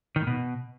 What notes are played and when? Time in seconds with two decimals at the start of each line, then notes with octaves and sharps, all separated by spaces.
0.16 D#3
0.21 A2
0.27 B2